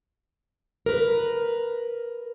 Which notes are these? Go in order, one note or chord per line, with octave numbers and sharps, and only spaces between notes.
A#4 B4